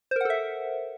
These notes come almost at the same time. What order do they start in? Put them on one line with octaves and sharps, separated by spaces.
C5 A#4 F#5 A4 E5